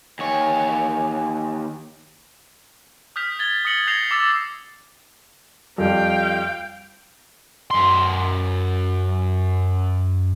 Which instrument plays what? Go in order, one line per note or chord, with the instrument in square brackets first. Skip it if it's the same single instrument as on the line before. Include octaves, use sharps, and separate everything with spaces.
[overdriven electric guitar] D#2 C#5 [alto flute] G#5
[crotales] D#6 F6 G6 B6 F7
G#6 A6 G7
D#6 A#6 C#7 F#7 G7
G6 G#6 A#6 C7 F7 G7
D6 E6 A6 A#6 C7
[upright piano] F2 G3 [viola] F5 G5
[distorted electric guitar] F#2 C6